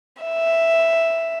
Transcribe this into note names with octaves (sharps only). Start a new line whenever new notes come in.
E5